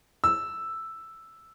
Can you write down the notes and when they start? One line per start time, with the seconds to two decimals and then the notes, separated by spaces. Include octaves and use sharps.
0.24 E6